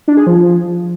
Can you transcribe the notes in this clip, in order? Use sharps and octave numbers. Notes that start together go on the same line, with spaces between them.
D4
G#4
F3